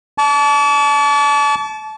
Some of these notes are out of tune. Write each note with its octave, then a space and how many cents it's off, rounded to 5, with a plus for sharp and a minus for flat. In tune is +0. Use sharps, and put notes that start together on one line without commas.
A5 -25 D6 -45